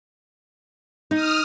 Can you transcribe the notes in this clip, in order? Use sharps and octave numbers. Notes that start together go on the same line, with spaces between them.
D#4 D#6 F6